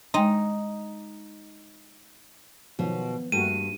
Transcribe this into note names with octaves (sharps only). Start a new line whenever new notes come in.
G#3 D#4 G5 C6
B2 D#3 F3 F#3
G2 A3 A#3 F#4 D#7